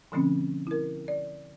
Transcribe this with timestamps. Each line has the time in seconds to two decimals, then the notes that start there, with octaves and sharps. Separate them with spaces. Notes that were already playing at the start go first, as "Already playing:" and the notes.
0.12 B2 D3 F3 A3 C4 C#4
0.67 E4 A#4
1.08 D5